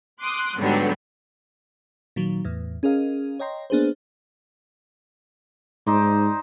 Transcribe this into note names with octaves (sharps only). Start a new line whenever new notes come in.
C6 D6 D#6 F#6
G#2 D3 F#3 G3 B3 D4
A#2 D#3 F#3
E2 A2
C#4 G#4 A#4 D#5 F5
C#5 D#5 G5 A#5 C6
A#3 B3 D4 G#4 B4 C5
G#2 D#4 C5 D5